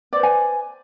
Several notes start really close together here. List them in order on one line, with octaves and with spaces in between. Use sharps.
D5 C5 B4 G#5